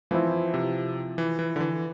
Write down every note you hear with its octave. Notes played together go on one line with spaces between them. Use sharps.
E3 F3 C4 E4
C3
E3
E3
D3
E3